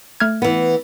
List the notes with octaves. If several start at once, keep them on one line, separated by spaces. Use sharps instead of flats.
A3 F6 G#6
E3 B3